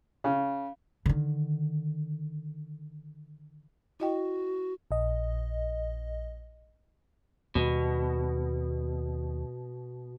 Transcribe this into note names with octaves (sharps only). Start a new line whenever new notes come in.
C#3
D3 D#3
E4 F#4 D#5 G5
A#1 D#5
D#2 B2 G3